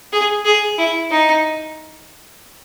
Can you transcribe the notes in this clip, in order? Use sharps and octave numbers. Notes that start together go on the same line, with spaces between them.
G#4
G#4
E4
D#4